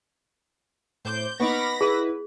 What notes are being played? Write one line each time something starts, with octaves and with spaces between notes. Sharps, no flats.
A2 C5 D6 G6
B3 D#4 B5 C#6 D6 F6 A#6
E4 G#4 B4